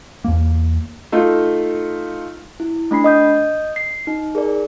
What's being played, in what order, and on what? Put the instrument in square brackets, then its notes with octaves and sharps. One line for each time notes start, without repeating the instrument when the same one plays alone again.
[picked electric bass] E2 A#3
[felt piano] A3 D#4 F4
[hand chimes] E4
A3 D4 B5 C7
D#5 D#6 G6
C7
D#4
G#4 A#4 D5